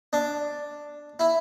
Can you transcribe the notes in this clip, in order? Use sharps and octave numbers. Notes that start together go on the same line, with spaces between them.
D4
E4